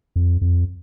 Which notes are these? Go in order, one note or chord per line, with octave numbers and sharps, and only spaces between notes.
F2
F2